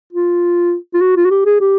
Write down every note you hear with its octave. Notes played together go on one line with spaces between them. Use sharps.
F4
F4
F#4
F4
F#4
G4
G#4
G4